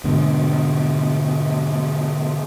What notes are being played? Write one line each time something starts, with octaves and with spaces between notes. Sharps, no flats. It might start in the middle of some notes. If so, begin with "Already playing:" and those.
G#2 B2 D3